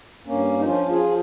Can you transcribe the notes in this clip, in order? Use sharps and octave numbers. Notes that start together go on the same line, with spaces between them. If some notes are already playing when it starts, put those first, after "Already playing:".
G2 A#3 C#4
D#4
F3 C#4 F4
F4 G#4
F3